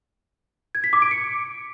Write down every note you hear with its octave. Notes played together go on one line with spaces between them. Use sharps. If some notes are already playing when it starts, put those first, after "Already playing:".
G#6
B6
D6
D7
C#7